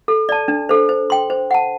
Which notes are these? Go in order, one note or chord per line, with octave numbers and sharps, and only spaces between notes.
A4
D5 A5
D4
A4 C5
C5
G5 C6
C5
F#5 A5